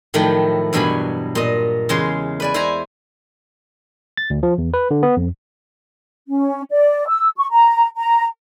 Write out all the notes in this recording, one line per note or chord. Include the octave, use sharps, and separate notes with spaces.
A2 D#3 F3 F#3 A3 G5
E2 G2 B2 F#3 G#5 B5
A#2 D#5
E2 C#3 G#3 C#5 C6
B4 D5 G#5
E4 C5 G#5 A#5
A6
D2
F3
E2
B4
D3
B3
F2
C#4
D5
E6
C#6
A#5
A#5